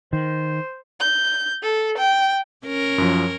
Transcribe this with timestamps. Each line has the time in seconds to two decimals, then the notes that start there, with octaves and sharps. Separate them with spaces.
0.13 D#3 C5
1.00 G6
1.63 A4
1.98 G5
2.65 C#4 A#4
2.98 F#2 F3